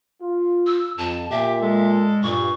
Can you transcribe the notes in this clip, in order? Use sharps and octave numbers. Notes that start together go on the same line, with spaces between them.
F4
E6
F2 A5
A#2 G4 E5
G#3 A4
G2 A#2 C#6